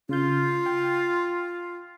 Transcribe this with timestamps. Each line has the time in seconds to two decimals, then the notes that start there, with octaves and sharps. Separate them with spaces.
0.09 C#3 F4 G6
0.66 G5